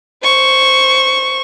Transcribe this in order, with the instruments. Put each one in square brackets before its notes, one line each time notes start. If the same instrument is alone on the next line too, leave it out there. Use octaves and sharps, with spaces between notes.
[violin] C5 C#6